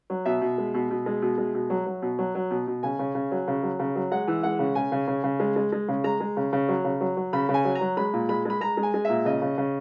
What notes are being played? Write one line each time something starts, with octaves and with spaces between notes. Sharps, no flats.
F#3
B2 E5
B2
G#3
B2
B2
G#3
B2
G#3
B2
F#3
F#3
B2
F#3
F#3
B2
B2
C#3 G#5
C#3
C#3
F#3
C#3
F#3
C#3
F#3
G#3 F#5
E3
G#3 F#5
C#3
C#3 G#5
C#3
C#3
C#3
G#3
G#3
G#3
C#3
G#3 A#5
G#3
C#3
C#3
F#3
C#3
F#3
F#3
C#3 B5
C#3
G#5
F#3
A#5
F#3
G#3 B5
A#2
G#3 B5
G#3 B5
G#3 A#5
G#3
G#5
G#3
A#2 E5
C#3 D#5
C#3
C#3